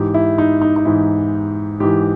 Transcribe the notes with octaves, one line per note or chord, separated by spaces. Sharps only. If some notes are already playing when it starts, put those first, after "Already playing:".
Already playing: G#2 E3 G4
E4
D#4
D#4
D#4
G#2 E3 E4
G#2 E3 G4